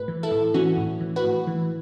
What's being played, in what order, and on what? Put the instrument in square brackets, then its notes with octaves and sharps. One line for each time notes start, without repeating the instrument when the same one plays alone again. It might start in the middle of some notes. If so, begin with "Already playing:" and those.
Already playing: [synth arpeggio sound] A2 B4
E3
E4 A4
A2
E3 C#4 F#4
A2
E3
F#4 B4
A2
E3